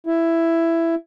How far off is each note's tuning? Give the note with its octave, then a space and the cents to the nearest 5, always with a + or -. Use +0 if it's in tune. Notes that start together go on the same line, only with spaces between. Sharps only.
E4 +10